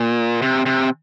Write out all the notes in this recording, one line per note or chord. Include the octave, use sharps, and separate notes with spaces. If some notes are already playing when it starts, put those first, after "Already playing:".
Already playing: A#2
C3
C3